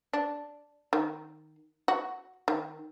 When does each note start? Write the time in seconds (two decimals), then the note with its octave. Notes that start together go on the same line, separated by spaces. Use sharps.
0.13 D4
0.93 D#3
1.88 F#4
2.48 D#3